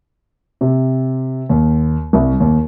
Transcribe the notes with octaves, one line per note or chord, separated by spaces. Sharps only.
C3
D#2
C2
D#2